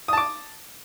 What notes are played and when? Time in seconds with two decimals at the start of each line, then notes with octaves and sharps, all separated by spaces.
0.08 D#6
0.13 A5
0.17 D6